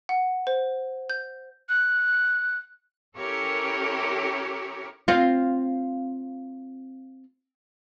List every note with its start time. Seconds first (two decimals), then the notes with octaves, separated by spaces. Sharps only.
0.09 F#5
0.47 C5
1.10 G6
1.69 F#6
3.17 C#4 E4 G4 A4 A#4 C#5
5.08 C4 F4